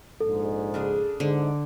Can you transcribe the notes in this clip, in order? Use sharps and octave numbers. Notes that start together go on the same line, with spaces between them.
A#1 G#2 A4
C#3 D4 G#4
G#2 D3